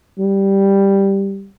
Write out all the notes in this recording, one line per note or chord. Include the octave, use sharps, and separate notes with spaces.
G3